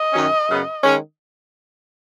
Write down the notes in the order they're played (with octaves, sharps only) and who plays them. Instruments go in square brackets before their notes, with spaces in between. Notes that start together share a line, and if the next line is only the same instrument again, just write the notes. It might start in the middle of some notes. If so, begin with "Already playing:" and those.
Already playing: [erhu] D#5
[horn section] F#2 D#3 F#3 C#4
F#2 C#3 B3
D#3 G#3 C#4